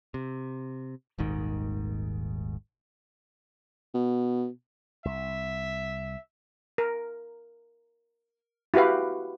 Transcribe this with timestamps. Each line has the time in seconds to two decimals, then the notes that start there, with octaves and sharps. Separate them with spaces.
0.14 C3
1.18 D#1 G#1 G#2 D#3
3.94 B2
5.05 C2 E5
6.78 A#4
8.74 E4 F#4 G4 B4 F5